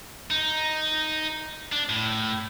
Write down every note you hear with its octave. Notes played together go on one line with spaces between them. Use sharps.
D#4
D4
A2